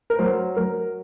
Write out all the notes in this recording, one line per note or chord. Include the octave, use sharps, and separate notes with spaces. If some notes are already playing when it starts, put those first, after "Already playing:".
A#4
F#3 C5
F#3 A#4